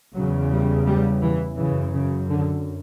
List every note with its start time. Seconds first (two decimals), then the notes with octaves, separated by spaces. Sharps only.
0.15 E2 C#3 F#3
0.51 G3
0.86 G3
1.21 E3
1.58 F#2 C#3 E3
1.94 C#3
2.29 D3